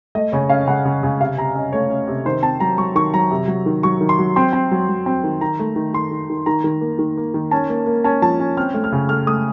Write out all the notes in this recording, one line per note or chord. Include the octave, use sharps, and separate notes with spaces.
A3 D#5
C#3 C#5
C#4 F5
C#3 F#5
C#3
C#3
C3 F5
C3 A#5
C#4 D#5
A3 C#5
C#4
C3
D#3 C5
C4 A5
F#3 A#5
F#3 C#6
D#3 C#6
F#3 A#5
C3
F#3
D#3
F#3 C#6
D#3
C6
F#3
C4 C6
C4
F#3
F#3
C4
D#3
D#3 A#5
A3
D#3
D#3 C6
D#3
D#3
D#3 A#5
D#3
A#3
D#3
A#3
D#3
C#4 A5
A#3
A#3
C#4 A5
F3 A5
C#4
C4 F6
A3
F6
C#3
A3 F6
A3 D#6